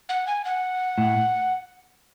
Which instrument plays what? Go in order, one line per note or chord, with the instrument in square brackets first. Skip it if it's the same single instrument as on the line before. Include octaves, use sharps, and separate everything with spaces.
[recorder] F#5
G#5
F#5
[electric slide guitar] A2